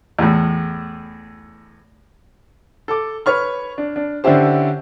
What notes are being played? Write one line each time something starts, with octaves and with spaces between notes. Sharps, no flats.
E2 A2
A4 D6
B4 C#5 C#6 F6
D4
D4
D3 C#4 D4 E4 G4 C5